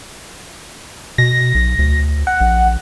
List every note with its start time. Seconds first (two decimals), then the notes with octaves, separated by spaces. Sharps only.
1.18 B2 A#6
1.55 B1
1.79 D2
2.27 F#5
2.41 A#1